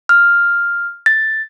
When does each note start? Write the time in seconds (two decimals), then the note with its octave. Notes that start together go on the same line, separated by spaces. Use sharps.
0.09 F6
1.06 A6